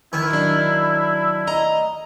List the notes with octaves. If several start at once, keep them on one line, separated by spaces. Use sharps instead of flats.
D#3 E4
F#3 D4
A3 D#5 A#5